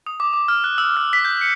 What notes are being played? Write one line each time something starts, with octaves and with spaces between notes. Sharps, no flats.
D#6
D6
D6
F6
F#6
E6
F6
B6
G6
C#7